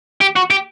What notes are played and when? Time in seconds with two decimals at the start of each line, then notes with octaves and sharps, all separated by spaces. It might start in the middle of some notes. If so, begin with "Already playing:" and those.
0.21 G4
0.36 F#4
0.51 G4